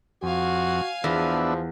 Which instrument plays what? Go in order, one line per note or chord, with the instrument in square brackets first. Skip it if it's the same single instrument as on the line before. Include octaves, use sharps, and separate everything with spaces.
[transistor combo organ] F2 [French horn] F#4 [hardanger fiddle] F5 G#5
[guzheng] E2 [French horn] F3 [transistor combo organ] B3 D4 E5